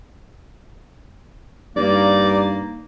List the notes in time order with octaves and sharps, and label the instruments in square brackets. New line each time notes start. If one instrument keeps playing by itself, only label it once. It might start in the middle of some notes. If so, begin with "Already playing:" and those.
[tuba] G2 [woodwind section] A#3 D#4 [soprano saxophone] D5